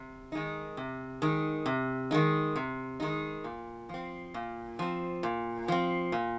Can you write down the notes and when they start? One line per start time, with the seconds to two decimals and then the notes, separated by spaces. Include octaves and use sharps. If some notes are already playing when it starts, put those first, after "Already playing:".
Already playing: C3
0.32 D#3 G#3 D#4
0.77 C3
1.22 D#3 G#3 D#4
1.66 C3
2.11 D#3 G#3 D#4
2.56 C3
3.00 D#3 G#3 D#4
3.44 A#2
3.89 F3 C4
4.34 A#2
4.79 F3 C4
5.23 A#2
5.68 F3 C4
6.12 A#2